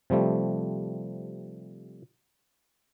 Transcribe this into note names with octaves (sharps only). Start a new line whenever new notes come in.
C3 F3 G3 A3